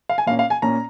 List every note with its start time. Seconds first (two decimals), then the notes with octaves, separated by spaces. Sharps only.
0.09 F5
0.18 G#5
0.26 A#2 A#3 C#4 F5
0.39 F5
0.50 G#5
0.62 A#2 A#3 C#4 A#5